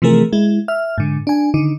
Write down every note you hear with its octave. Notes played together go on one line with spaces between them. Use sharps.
C3 E3 F3 A3 G#4 A#4
G#3 E4
E5 F6
G#2 D3
D4 G#5
D3 D#3 D#4